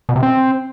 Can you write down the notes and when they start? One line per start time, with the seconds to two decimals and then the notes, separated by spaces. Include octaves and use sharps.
0.09 B2
0.16 C3
0.23 C4